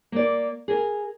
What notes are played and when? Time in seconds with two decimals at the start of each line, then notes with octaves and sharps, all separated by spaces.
0.12 A#3 D5
0.68 G#4 A#4